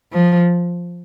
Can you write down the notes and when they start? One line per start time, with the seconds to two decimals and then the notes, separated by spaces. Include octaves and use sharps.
0.13 F3